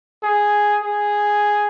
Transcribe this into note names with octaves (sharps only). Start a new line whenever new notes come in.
G#4
G#4